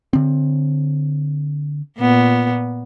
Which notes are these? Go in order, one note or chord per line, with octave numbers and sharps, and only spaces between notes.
D3 C4
A#2 B3